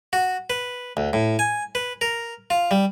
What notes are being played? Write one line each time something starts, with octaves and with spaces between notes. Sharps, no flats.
F#4
B4
D2
A2
G#5
B4
A#4
F4
G3